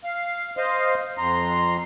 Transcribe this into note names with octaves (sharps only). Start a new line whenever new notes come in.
F5
C5 D#5 F5
F2 A#5 C6